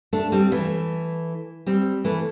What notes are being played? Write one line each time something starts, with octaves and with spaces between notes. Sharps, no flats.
A3 D4
G3 C4
E3 A3
G3 C4
E3 A3